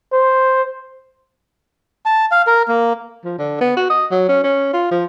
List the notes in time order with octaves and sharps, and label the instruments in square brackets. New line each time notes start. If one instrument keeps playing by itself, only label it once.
[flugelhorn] C5
[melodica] A5
F5
A#4
A#3
[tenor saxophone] F3
D3
B3
F#4
D#5
F#3
C#4
C#4
F4
F3